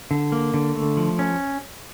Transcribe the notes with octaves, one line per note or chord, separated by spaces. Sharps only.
D3
A#3
D3
A3
F3
C#4